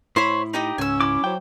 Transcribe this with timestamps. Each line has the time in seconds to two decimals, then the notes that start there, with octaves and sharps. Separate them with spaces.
0.16 A2 E4 C5 C#5 B5
0.54 D#4 G4 D#5
0.78 C#2 G#2 C#4 G#5 E6
1.01 E4 D6
1.24 F#3 C5 G5